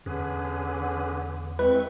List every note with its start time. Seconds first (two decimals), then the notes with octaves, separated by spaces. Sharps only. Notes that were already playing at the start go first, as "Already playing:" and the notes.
0.06 E2 D3 C#4 G#4 B4
1.59 G#3 C4 E4 B4 C#6